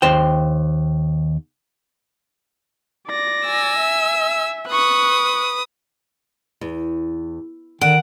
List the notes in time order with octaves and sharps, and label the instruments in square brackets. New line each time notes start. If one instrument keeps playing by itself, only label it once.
[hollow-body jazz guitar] D#2 C5 G5
[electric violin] D5 A#6
[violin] G#5 E6
[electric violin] E5
[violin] B4 D#6 [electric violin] C#6 F#6
[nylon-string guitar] E2
[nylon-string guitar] D3 [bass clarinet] D#3 [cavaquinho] F#5 [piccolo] D7